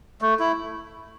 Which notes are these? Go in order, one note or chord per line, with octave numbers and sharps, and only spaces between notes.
A3
E4